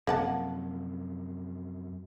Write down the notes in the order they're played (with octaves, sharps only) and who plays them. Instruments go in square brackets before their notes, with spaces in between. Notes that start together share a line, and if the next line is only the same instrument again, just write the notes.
[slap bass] F#2 C3 F3 [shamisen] A#3 F#5 A5